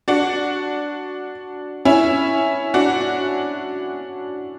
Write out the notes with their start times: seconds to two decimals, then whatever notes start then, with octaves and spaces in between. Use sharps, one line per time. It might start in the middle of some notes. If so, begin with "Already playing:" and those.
0.08 D4 F#4
1.85 C#4 E4
2.74 D4 F#4